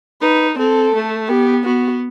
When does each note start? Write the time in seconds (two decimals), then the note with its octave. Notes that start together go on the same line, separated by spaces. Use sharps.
0.21 D#4 B4
0.58 C4 A4
0.94 A3
1.29 B3 G4
1.65 B3 F#4